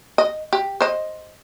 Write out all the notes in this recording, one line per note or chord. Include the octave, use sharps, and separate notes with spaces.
D#5
G4
C5 D#5